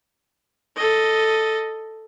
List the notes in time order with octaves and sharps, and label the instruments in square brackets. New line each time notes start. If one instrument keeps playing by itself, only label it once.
[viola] A4 D#5